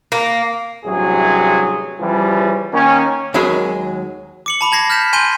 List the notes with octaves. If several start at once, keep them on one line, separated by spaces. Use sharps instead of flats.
A#3
A1 G2 C3 F#3 G#4
C#3 E3 F3 G3
D#3 A#3 C#4
D#2 D#3 F#3 G#3 G#4 B5
D6 C#7 F#7
A5 B5 D6
A5 G#6 A#6 C7
F6 G6 B6 E7
G#5 C6 G6 D#7 G7